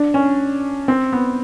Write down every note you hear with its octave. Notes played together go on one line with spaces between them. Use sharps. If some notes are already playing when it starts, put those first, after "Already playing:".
Already playing: D4
C#4
C4
B3